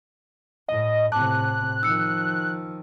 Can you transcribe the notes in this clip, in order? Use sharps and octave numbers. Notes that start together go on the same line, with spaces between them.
A2 D#5
A2 C3 A5 D6 F#6
D#3 F3 E6 C#7